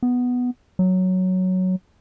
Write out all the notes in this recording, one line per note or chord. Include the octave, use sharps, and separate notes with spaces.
B3
F#3